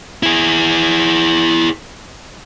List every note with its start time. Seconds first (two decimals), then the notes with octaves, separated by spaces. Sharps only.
0.23 E4 G#4